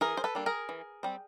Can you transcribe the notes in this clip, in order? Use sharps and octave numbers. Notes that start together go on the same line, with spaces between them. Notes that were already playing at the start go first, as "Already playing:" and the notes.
E3 G#4 A#4
C5
A4 B4
G3 A#3 D4
G#4 A#4
E3
G3 C4